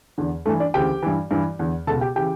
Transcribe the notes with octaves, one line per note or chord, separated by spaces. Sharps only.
E2 D3
G2 E3 A3 A4
D4 D5
D2 C#3 E3 G4 G5
G2 E3
G2 E3
E2 D3
C#2 B2 A4 A5
G4 G5
C#3 E3 G4 G5